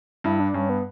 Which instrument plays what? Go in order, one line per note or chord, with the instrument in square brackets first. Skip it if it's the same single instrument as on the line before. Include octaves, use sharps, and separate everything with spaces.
[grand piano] G2 [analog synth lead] E4
[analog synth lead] D4
[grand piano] G2 [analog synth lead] C#4
[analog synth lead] B3